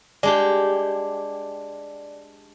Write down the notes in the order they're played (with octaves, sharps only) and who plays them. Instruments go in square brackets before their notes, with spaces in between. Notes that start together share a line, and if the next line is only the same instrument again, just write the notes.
[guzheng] G#3 D4 G4 [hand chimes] D5